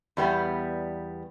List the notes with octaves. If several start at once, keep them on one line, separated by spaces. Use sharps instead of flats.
E2 G3 B3